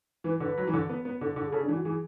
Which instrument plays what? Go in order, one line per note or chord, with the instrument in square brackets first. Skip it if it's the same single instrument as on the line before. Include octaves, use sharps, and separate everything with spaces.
[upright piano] E3 [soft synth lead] B4
[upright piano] D3 [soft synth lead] B4
[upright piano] F#3
E3
D3
B3
B3
[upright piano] D3 [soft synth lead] A4
[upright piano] D3
[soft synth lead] G#4
[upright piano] C#3 [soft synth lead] A4
[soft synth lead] D4
[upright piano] E3
[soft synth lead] F#4
[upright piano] E3 [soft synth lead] G#4